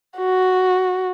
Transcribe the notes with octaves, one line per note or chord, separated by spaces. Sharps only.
F#4